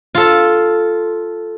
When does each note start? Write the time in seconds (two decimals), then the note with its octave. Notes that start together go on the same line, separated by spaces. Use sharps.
0.15 F4 A4